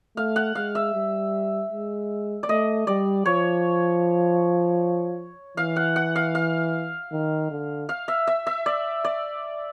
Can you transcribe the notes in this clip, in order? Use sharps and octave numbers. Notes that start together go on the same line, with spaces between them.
A3 F5
F#5
G#3 F5
E5
G3
G#3
D5
A3 D#5
G3 D5
F3 C#5
E3 F5
F#5
F#5
F5
F5
D#3
D3
F5
E5
E5
E5
D5
D5